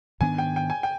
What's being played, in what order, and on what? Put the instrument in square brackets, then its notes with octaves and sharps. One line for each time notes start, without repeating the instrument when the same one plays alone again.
[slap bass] G#2 D#3 B3 D4 [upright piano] G#5
[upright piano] G5
G5
G#5
G5